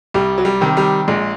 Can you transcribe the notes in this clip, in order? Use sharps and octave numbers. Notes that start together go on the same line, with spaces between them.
C2 G3
F#3
G3
C3 D#3
G3
A#1 G#3